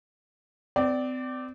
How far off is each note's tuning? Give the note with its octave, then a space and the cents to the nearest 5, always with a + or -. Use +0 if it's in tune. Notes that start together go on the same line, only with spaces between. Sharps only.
C4 -35 D5 +0